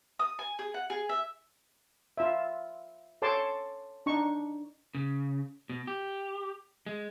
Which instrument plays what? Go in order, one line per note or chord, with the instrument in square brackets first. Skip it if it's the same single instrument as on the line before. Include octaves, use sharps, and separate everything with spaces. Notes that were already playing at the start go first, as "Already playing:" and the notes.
[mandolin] D#6
G#5
G#4
F#5
G#4
E5
[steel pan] F4 E5
A4 C#5 A5 C6 D6
D4 D#4 C#6
[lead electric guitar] C#3
B2
G4
G#3